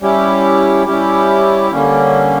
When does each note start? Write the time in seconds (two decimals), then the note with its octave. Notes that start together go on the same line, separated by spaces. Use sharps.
0.01 G3 C#4 E4 G4
0.87 G3 C#4 E4 G4
1.71 D3 G3 A#3 C#4